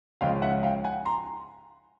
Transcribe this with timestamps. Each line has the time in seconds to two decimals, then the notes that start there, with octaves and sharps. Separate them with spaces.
0.21 C#2 C#3 F3 G#3 C#4 F5 G5
0.42 E5 F#5
0.63 F5 G5
0.84 F#5 G#5
1.05 A#5 C6